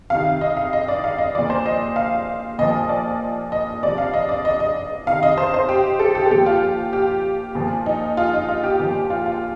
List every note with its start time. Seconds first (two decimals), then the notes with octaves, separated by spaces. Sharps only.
0.10 C3 D#3 F5
0.41 D#5
0.57 F5
0.73 D#5
0.88 D5
1.04 F5
1.18 D#5
1.35 A#2 F3 D5
1.50 C5
1.66 D#5
1.96 F5
2.58 A#2 F3 D#5
2.89 D5
3.52 D#5
3.82 C3 F3 D5
3.98 F5
4.14 D#5
4.29 D5
4.45 D#5
4.60 D#5
5.06 C3 D#3 F5
5.23 D#5
5.38 C5
5.54 C5
5.69 G4
5.99 A4
6.15 G4
6.26 A4
6.31 A#2 F3 G4
6.46 F4
6.93 G4
7.55 A#2 F3
7.86 D#4
8.17 F4
8.33 D#4
8.49 F4
8.64 G4
8.80 A#2 F3
9.10 F4
9.26 F4